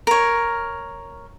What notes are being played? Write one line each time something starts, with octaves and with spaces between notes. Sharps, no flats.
A#4 C#5